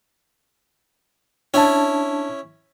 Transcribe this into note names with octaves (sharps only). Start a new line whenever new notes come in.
C#4 D4 E4 A5